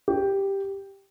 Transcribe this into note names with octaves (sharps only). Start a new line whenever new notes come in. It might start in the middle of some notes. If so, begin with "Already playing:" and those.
G4